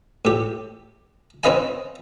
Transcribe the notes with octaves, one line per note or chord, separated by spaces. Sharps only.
A2 G4
C4 C#4 B4 D#5 F5 G#5